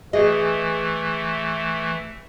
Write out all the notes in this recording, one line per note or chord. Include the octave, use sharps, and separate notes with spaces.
E3 A3 G#4 D#5